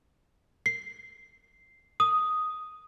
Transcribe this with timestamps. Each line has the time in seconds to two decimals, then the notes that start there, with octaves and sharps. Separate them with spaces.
0.66 C7
2.00 D#6